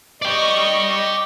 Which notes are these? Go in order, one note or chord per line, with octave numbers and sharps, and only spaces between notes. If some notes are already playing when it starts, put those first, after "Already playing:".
D5 D#5 G5 C#6